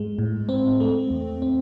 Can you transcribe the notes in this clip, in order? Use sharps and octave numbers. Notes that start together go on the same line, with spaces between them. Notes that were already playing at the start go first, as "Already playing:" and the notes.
Already playing: G#2 G#3
A2
C4
A3
E2
C4